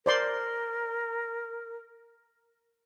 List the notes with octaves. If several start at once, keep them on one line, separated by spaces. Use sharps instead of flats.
A#4 C5 D5 C6